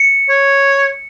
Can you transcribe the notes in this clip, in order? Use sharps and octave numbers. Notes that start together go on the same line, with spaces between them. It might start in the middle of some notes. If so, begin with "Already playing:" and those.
Already playing: C#7
C#5